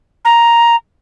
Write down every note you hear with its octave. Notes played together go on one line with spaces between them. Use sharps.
A#5